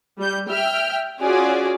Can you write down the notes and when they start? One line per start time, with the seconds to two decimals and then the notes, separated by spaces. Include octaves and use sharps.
0.18 G3 G6
0.49 E5 G5 F6
1.22 C#4 F4 F#4 G#4 D5